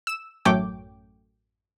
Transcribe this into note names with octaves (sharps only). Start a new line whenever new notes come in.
E6 E7
A1 F#2 A3 C#5 G5 D6